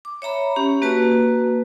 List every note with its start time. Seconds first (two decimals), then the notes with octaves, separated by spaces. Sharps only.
0.05 D6
0.22 C#5 E5 A#5 B5
0.56 C#4 G4
0.82 A#3 F#4 B4 A5